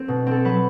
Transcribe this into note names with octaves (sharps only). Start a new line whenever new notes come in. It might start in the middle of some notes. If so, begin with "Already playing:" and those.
Already playing: C4 A4
B2
C4 A4
F#3 B4